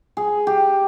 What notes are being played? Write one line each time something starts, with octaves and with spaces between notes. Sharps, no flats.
G#4
G4